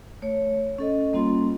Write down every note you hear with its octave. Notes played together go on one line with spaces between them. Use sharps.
A3 C#5
C#4 A4 D#5
G3 A#3 C#4 F4 C6